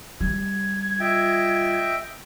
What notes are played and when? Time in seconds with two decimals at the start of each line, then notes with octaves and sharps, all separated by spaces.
0.21 G3 G#6
1.00 F4 D#5 E5 G5